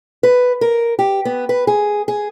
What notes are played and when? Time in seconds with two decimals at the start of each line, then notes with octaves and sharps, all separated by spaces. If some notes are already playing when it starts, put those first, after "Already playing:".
0.23 B4
0.61 A#4
0.99 G4
1.25 B3
1.49 B4
1.67 G#4
2.08 G#4